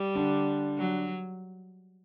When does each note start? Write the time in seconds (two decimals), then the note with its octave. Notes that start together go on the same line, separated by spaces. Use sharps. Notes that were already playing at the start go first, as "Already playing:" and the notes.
Already playing: G3
0.15 D3 D4
0.78 F#3